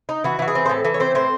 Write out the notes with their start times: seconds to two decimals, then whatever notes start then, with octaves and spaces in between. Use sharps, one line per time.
0.09 D#4
0.24 E3 F#4
0.39 E3 F#4
0.48 G#4
0.55 C4
0.66 C5
0.69 A2 A4
0.84 E3 A4
0.94 C#5
1.00 C4 C5
1.15 A2 C5